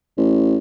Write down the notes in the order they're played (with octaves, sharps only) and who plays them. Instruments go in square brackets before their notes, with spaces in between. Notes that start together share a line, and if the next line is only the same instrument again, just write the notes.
[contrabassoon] A1